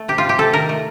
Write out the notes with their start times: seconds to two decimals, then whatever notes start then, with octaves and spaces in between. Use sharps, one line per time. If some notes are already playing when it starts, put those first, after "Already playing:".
Already playing: A3
0.08 C3 G4
0.18 F4
0.24 C3 G4
0.38 C3 A4
0.53 D#3 A#4
0.69 A3